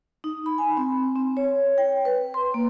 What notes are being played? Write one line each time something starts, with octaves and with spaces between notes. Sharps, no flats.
D#4
B5
G#5
C4
C4
C#5
G5
B4
C6
A#3